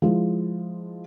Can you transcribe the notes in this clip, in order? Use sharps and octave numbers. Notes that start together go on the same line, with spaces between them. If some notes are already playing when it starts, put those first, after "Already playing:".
F3 G#3 E4